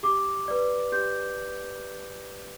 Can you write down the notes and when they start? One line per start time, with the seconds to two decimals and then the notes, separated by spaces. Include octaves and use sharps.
0.03 G4 D6
0.48 B4 D5
0.92 G4 G6